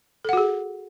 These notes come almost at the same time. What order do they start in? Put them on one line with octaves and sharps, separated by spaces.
A4 F#5 F#4 G#4